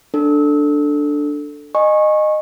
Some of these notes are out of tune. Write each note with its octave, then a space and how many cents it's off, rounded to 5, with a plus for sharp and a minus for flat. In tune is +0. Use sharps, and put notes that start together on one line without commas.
D4 +0 A4 +5 E6 -30
D#5 -20 G#5 +0 C#6 -20